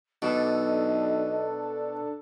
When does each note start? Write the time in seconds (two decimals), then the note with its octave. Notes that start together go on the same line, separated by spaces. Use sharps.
0.22 B1 B2 D4 A4 D#5